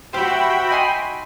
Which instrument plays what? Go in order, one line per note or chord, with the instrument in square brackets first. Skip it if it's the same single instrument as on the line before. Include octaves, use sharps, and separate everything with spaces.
[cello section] F#4 E5 [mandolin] G4 C5 [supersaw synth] G5 B5
[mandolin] D#4 G#5 C6